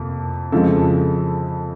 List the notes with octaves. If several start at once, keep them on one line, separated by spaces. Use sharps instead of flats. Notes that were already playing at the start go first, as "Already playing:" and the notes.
Already playing: F2 C3 A#3
F2 C#3 F3 G#3 A4